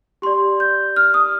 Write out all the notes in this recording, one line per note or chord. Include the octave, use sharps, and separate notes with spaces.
G4 D5 C6
G6
F6
D#6